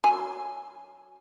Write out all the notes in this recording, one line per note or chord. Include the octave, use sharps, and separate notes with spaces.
F#3 G#5